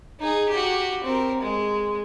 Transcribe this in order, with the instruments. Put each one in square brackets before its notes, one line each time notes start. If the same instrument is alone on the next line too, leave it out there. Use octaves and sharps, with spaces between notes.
[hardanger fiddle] D#4 G#4
F#4 G4
C4 A#4
G#3